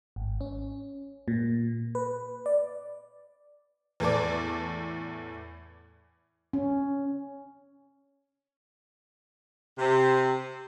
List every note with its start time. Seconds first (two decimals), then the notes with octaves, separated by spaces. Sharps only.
0.16 G#1
0.41 C#4
1.28 A#2
1.95 B4
2.46 D5
4.00 E2 A2 B3 A4 D5 D6
6.53 C#4
9.78 C3